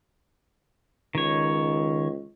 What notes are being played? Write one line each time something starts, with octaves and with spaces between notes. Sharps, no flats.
C#2 D#3 C#5